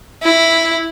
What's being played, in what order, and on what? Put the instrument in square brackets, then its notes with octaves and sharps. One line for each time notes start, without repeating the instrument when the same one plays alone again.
[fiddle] E4